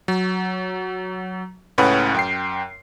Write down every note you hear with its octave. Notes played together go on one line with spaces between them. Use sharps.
F#3
C#2 A2 C#4 B4 F#5
F#2 G5 C7